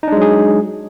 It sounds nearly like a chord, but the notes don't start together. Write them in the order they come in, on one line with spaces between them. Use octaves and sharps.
D#4 D4 G#3 F#3 G#4